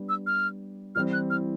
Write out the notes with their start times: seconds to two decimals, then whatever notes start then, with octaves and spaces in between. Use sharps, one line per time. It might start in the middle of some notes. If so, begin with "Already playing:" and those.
Already playing: G3 B3 D4
0.09 E6
0.26 F6
0.95 E3 G3 C4 F6
1.13 F#6
1.30 F6